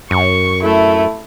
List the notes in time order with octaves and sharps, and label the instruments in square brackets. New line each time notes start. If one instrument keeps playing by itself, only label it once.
[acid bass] F#2 [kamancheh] C#6
[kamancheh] A3 E4